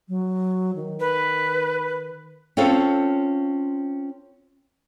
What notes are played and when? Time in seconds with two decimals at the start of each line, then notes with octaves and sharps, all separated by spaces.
0.09 F#3
0.76 D#3
1.00 B4
2.57 C4 C#4 F4 A4 C#5 F5